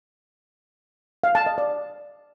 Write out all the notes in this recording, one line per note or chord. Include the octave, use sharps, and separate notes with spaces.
F5
A5
D#5
D5